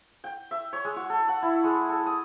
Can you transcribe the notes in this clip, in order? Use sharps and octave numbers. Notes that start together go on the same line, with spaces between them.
G5
E5
C#5
G#3
F#4
A4
F#5
E4
G#3
A4
D#6